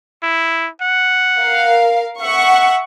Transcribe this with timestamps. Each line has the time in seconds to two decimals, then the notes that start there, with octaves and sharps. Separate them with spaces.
0.23 E4
0.82 F#5
1.38 A#4 F5
2.21 E5 F#5 C#6